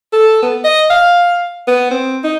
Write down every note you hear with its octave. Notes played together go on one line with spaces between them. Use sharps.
A4
B3
D#5
F5
B3
C4
D#4